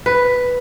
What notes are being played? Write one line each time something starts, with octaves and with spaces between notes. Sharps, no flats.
B4